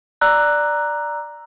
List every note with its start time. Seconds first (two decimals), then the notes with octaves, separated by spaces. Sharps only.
0.21 D5 A#5 E6 F#6